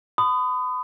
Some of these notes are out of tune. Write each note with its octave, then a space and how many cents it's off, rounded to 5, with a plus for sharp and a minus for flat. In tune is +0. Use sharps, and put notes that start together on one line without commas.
B5 +35 D#6 -10